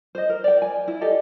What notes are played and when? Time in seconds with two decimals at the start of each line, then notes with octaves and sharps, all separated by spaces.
0.15 C5 D#5
0.29 A#4
0.44 D5 G5
0.62 G#5
0.88 E4
1.01 G4 A4 D5 D#5